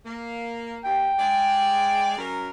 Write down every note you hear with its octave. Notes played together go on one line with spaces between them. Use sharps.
A#3
D#2 G5
G#3 D5
F#2 A#4